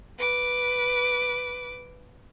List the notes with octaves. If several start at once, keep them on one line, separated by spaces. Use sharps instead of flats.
B4 D6